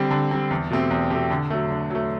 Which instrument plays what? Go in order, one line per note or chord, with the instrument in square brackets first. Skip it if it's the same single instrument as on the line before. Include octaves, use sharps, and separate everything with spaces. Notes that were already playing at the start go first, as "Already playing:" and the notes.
Already playing: [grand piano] D3 G3 C4
D3
G3 C4
E2
B2 A3 C4 G4
E2
B2 A3 C4 G4
D3
F#3 A3
D3
F#3 A3